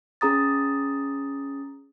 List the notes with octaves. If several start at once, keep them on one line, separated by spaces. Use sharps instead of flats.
C#4 G#4 A#5 D#6 A6